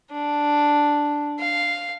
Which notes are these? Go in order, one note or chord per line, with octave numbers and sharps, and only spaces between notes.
D4
F5